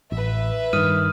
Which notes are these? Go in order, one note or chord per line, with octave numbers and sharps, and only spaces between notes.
A1 B4 E5
G2 D#3 D#6 F6 D#7